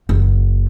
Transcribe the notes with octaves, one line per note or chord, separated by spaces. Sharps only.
F#1